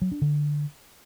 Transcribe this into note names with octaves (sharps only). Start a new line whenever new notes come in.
F#3
D4
D3